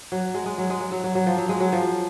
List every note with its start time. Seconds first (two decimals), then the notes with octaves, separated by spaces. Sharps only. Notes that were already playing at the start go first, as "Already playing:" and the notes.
0.12 F#3
0.34 G#3
0.46 G#3
0.58 F#3
0.70 G#3
0.80 F#3
0.92 F#3
1.04 F#3
1.15 F#3
1.26 F3
1.38 F#3
1.49 G#3
1.60 F#3
1.72 F3